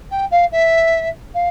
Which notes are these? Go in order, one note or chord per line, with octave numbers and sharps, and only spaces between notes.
G5
F5
E5
F5